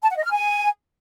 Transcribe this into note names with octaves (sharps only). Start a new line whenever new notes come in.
A5
F#5
D#5
F6
G#5